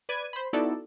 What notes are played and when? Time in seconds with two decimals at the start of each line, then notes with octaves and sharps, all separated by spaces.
0.09 B4 D5 G#6 D#7
0.33 C5 B5
0.53 B3 D#4 E4 F#4 A4 D5